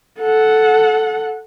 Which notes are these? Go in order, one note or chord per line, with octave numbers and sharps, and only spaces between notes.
A4 F#5